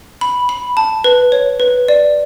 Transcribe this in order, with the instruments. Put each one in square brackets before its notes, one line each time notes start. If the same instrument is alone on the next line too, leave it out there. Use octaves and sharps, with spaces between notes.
[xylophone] B5
B5
A5
B4
C#5
B4
D5